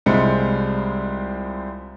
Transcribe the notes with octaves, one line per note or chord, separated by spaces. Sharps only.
C2 G3 G#3 C4 F4 C#7